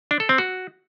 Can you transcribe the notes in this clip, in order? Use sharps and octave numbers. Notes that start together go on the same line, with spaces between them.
D4
A4
C4
F#4